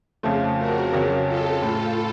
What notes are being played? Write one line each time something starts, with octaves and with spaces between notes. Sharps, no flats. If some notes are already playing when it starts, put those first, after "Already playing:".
F2 C#3 F3 A3
F#4 A#4
F2 C#3 F#3
F4 A4
A2